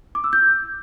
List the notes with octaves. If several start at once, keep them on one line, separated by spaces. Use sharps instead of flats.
D6
E6
G6